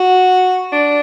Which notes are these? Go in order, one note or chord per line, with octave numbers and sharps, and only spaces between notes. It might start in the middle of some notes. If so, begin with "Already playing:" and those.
Already playing: F#4
D4